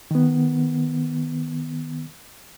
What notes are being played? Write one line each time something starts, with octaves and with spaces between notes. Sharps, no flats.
D#3 B3